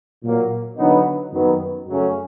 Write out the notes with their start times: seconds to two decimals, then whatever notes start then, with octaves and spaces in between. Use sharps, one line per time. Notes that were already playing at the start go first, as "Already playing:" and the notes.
0.22 A#2 F#3 A#3
0.77 D3 F#3 B3 D#4
1.32 F#2 D#3 F#3 B3
1.87 F#2 C#3 F#3 A3 C#4